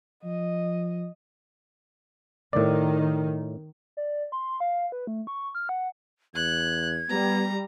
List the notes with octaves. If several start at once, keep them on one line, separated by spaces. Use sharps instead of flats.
F3 D#5
A2 D#3 D5
D5
C6
F5
B4
A3
C#6
F6
F#5
E2 F#6 G#6
G3 B3 A#5